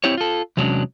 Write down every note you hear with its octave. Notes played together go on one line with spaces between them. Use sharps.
C4 E4 G4 C#5
F4 A4
E2 C3 F#3 G#3 C#4 D4